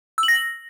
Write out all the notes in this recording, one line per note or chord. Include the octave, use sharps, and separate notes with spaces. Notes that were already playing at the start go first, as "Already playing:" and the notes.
E6
F#7
A#6